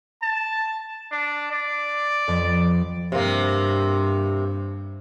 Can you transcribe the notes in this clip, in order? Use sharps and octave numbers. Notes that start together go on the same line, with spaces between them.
A5
D4
D5
F2 B3
G2 C3 A#3